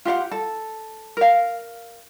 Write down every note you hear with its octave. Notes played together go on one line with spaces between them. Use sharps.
F4 G4 F5 F#5
A4
A#4 F5